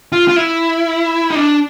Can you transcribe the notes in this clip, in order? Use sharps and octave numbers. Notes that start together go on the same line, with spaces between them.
F4
F4
E4
D#4
D4